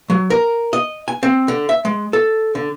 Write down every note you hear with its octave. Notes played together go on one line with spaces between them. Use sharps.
F#3
A#4
D#5
G#5
C4
D3
E5
G#3
A4
D3